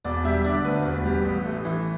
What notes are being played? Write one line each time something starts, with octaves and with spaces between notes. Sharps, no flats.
E1 D5
G3 E5
D3 D5
D2 B4
E1
G3
A1
A3
E3